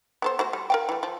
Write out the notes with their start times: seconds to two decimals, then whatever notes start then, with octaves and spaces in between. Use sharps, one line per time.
0.22 B3 A4 C5
0.39 A3 F#4 C5
0.53 G3
0.70 A#4 F5 G5
0.89 E3 A3
1.03 F3